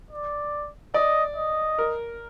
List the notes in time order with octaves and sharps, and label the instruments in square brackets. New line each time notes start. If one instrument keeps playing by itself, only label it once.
[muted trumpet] D5
[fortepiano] D5 [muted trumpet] D#5
[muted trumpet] D#5
[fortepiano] A#4